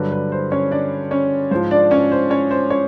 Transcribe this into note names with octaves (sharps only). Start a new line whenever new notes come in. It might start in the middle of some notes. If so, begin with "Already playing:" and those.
Already playing: G2 D3 F#3 B4
B4
C5
C#4 C#5
D4 D5
C#4 C#5
G#2 F3 C5
D4 D5
C#4 C#5
C5
C#4 C#5
C5
C#4 C#5